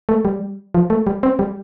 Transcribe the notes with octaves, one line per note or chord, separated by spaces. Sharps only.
A3
G3
F3
A3
G3
C4
G3